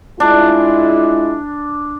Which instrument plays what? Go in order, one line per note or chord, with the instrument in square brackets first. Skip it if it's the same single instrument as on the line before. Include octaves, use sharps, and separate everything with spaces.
[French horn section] G#3 E4 F4 [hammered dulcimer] D4